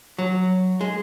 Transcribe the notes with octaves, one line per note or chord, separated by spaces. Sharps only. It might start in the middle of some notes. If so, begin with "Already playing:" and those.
F#3
G#3